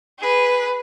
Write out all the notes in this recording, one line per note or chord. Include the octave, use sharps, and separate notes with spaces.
G#4 B4